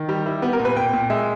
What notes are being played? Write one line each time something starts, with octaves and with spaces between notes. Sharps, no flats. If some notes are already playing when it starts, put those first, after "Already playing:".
Already playing: D#3
G3 G4
G3 E4
B3 G4
A#4
A#2
B4
A#2 G5
A#2
G#3 E5